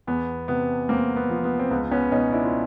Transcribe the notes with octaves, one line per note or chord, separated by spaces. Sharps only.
E2 B3
C3 B3
E2 A#3 C4
B3
F3
B3
C4
C#2 B3
B3 C#4
B2 C#4 D#4
D4 E4
F4